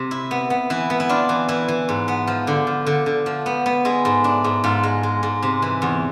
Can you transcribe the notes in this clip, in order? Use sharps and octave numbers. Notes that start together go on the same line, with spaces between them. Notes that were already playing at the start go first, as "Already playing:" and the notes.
Already playing: C3
E4
B3
B3
E3 E4
B3
E4
D4 F4
E3
E3 E4
E3
G#2
B3
F3
D3
F3
D3
D3
F3
B3
B3
G#3 E4
G#2
D4
G#2
G#2 F4
G#3
G#3
G#2
C3
E3
E2